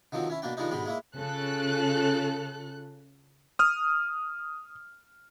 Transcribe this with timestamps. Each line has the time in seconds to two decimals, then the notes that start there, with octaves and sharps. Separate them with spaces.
0.12 D3 D#3 F3 F#3 C4
0.30 C#4 E4
0.42 B2 A#3 D4 G5
0.57 D#3 F3 G3 G#3 D4 D#4
0.71 G#2 B2 D3 G3 G#3
0.86 G#3 A#3 E4
1.17 C#3 F4 A4 F#6
3.59 D#6 F6